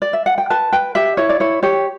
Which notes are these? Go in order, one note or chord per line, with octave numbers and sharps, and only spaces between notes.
D5
E5
F#5
G5
B4 A5
B4 G5
G4 E5
E4 C#5
D5
E4 C#5
G4 C#5